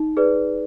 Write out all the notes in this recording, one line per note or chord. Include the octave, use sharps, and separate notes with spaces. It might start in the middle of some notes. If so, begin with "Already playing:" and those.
Already playing: D#4
G#4 B4 D5